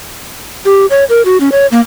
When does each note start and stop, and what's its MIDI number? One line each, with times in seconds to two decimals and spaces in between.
0.65 0.86 67
0.90 1.04 73
1.09 1.22 70
1.25 1.37 66
1.40 1.50 61
1.52 1.67 73
1.72 1.80 58